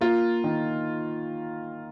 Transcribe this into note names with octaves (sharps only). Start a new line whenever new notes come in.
A#3 F4
D#3